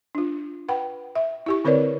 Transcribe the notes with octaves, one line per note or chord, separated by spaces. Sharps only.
D4 F4
B4 F#5 G5 B5
E5
E4 G4 C#6
D3 C4 A#4 B4 C#5 D5